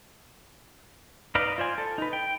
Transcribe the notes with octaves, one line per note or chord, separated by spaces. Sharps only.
D#4 B4 D5 D#5 F5
F4 C5 D5 G#5
A4
D#4 B4
G5